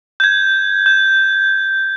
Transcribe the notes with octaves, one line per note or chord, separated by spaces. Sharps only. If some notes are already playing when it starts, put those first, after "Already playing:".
G6 G#6
G6